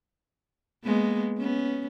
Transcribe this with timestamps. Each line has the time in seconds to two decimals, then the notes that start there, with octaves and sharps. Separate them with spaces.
0.84 G#3 A#3 B3
1.38 B3 C#4